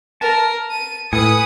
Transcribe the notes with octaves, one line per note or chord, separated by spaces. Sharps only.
A#4 A5
D#7
A2 B4 G#5 B5 D#6 C#7